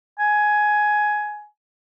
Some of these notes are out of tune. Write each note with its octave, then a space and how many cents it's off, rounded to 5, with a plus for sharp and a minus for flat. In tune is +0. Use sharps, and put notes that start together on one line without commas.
G#5 +15